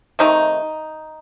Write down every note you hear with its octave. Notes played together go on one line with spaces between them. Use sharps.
C3 D#3 A3 D#4